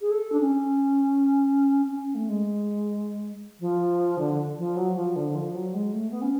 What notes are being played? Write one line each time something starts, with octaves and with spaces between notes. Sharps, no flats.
G#4
A4
D4
C#4
C#4
C#4
A3
G#3
F3
D3
F3
F#3
F3
D3
F3
F#3
G#3
A3
B3
C#4